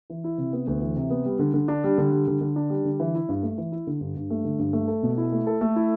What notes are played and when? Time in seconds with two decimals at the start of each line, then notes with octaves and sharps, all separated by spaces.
0.10 E3
0.24 E4
0.38 C3
0.53 B3
0.67 D2
0.82 E3
0.96 C3
1.10 B3
1.25 G3
1.39 D3
1.54 D3
1.68 D4
1.84 G3
1.98 D3
2.12 G3
2.27 D3
2.41 D3
2.56 D4
2.70 G3
2.85 D3
3.00 E3
3.15 E4
3.29 G2
3.43 A3
3.58 E3
3.72 E4
3.87 D3
4.01 G2
4.16 G2
4.30 A3
4.44 D3
4.59 G2
4.73 A3
4.88 A4
5.03 B2
5.17 E4
5.32 A3
5.47 A4
5.61 A3
5.76 E4